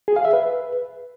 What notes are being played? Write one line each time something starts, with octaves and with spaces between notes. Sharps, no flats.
G#4
F5
E5
B4